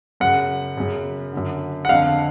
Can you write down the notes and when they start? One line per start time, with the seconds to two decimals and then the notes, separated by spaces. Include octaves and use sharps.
0.20 F#2 C#3 F#5
0.77 F#2 C#3
1.33 F#2 D3
1.85 F#5
1.89 F2 D3 F5